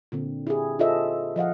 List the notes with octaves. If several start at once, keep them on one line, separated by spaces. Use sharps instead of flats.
A#2 D3 C4
E4 G4 G#4
F4 G#4 A4 C5 D#5 E5
F3 D#5 F5 F#5